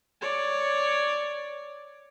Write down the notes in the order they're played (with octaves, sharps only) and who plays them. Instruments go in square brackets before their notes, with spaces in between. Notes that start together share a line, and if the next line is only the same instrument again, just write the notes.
[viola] C#5 D5